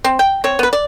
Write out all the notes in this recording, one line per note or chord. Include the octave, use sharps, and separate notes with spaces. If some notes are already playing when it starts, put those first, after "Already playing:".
C4
G5
C4 C#5
B3 B4
D5